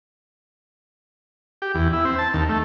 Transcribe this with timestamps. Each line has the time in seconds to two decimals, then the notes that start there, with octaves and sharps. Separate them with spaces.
1.62 G4
1.75 E2
1.93 E4
2.05 C4
2.18 A5
2.34 D#2
2.49 A3